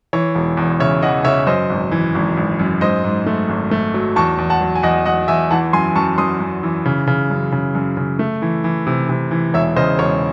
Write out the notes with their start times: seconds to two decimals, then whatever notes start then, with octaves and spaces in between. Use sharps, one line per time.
0.13 E3 C#5
0.35 E1
0.57 E2
0.80 C#3 C#5 E5
1.02 E3 D#5 F#5
1.24 C#3 C#5 E5
1.47 F#2 C5 D#5
1.70 G#1
1.91 E3
2.15 G#1
2.37 G#1
2.59 F#2
2.81 G#2 C5 D#5
3.04 G#2
3.26 A3
3.49 G#1
3.71 A3
3.94 F#3
4.16 E2 A5 C#6
4.38 E2
4.50 F#5 A5
4.61 F#3
4.75 G#5
4.83 E2 D#5 F#5
5.06 F#3 D#5 F#5
5.28 E2 E5 G#5
5.51 E3 F#5 A5
5.73 F#2 G#5 C6
5.95 F#2 A5 C#6
6.18 F#2 C6 D#6
6.40 F#2
6.63 E3
6.85 C#3
7.07 C#3
7.30 F#2
7.52 C#3
7.75 F#2
7.97 C#3
8.19 A3
8.42 E3
8.64 E3
8.87 C3
9.09 C3
9.31 E3
9.54 E1 C#5 E5
9.76 C#3 C5 D#5
9.99 E1 C#5